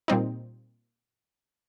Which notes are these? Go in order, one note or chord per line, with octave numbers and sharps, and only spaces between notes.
A#2 G3 C4 D#4